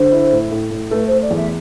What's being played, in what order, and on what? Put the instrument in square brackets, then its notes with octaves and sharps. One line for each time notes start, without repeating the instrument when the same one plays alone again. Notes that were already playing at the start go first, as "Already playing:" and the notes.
Already playing: [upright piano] D3 [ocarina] C5
[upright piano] E4
A2
A2
A2
[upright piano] A3 [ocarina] B4
[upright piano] A3 [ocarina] C5
[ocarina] D5
[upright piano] E2
[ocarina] E5